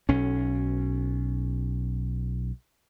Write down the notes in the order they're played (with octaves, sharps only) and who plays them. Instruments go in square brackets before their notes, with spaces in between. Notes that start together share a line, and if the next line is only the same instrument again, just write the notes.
[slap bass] B1 C#4